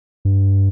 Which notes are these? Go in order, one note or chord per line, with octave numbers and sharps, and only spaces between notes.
G2